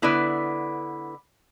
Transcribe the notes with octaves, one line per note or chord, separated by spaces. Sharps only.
D3 B3 E4 B4 D5